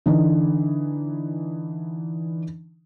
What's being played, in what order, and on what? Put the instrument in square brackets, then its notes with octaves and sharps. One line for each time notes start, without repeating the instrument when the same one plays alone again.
[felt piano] D3 E3 D#4